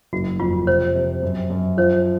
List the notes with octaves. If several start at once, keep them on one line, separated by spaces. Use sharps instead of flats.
F#1 F#4
F2 F4
C3 C5
C3
F#2
F#2
F3 C5